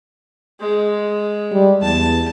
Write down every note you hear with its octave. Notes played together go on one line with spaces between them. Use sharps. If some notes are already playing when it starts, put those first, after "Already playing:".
G#3
G3
E2 A5